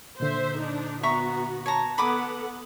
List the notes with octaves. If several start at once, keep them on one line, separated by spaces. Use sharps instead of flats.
A#2 D3 C5 E5
D4 D#4
B3 F#4 E5 A#5 C#6
C#5 A5 A#5
B3 A4 F#5 B5 D6 D#6